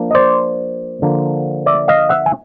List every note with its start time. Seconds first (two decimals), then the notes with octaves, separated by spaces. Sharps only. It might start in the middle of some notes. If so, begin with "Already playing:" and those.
Already playing: F3 A#3 D4
0.11 D#5
0.15 C5 D5
1.02 D3 F3 A#3
1.66 D5 E5
1.88 D#5 F5
2.09 E5 F#5
2.26 G#5